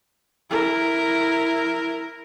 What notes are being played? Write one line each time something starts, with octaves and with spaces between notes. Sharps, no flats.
E4 A#4